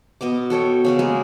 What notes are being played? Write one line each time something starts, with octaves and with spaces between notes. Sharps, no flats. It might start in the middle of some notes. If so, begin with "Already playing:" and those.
B2 B3 D#5 D6
F#4 A4 C#5 G5
C#3 B3 F#4
G#3 A#3 G#4